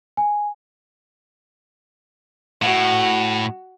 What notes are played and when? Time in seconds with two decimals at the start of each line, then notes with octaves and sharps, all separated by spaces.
0.17 G#5
2.62 A2 F#4